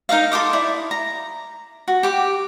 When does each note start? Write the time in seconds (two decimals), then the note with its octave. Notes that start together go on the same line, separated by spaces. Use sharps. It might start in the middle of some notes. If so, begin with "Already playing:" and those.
0.09 D#4 A#4 D#5 F5
0.32 A4 C6 D6 D#6
0.53 E4 D5
0.91 A#5
1.88 F#4
2.03 G4 D6